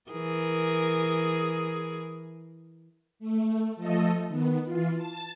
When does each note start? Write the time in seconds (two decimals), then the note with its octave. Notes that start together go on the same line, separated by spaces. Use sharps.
0.10 E3 G#4 A#4
3.19 A3
3.76 F3 A3 A4 D#5
4.28 D#3 B3
4.65 E3 F4
4.96 A5 A6